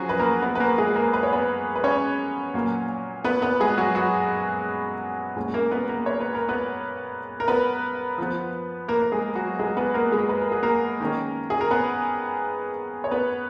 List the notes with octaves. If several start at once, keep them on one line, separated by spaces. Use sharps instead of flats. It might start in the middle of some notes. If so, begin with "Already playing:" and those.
Already playing: F3 F#3 C#4 F#4 G#4
B4
A#3 A#4
B3 B4
B4
A#3 A#4
G#3 G#4
A#3 A#4
B4
C#5
B3 B4
B4
C#4 C#5
A#2 F#3 A#3
B3 B4
B3 B4
G#3 G#4
F#3 F#4
F#3 F#4
A#2 G#3 C#4
A#3 A#4
B3 B4
A#3 A#4
C#5
B4
A#4
B3 B4
A#4
B3 B4
F3 B3
A#3 A#4
A#4
G#3 G#4
F#3 F#4
G#3 G#4
B3 B4
A#3 A#4
G#3 G#4
B4
A#4
G#4
A#3 A#4
D#3 A#3 C#4
G#4
A#4
B3 B4
C#5
B3 B4